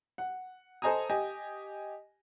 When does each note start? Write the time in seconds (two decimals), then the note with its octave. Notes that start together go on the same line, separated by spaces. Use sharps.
0.18 F#5
0.82 A4 C5 D#5 G#5 A#5 D#6
1.09 G4 D#5 G#5